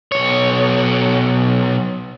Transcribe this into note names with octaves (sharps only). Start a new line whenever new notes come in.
B1 C#5